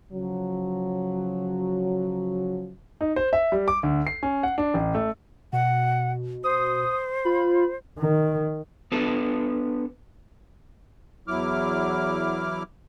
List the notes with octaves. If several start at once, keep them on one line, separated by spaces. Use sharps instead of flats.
C#3 F3 F#3
D#4
C5
E5
G3
D6
D2
C7
C#4
F#5
D4
A1
A3
B2 F#5
C5 D#6
F4 B5
D#3
B3 D4 A4 B4
E2 F#3 E4 D6 F6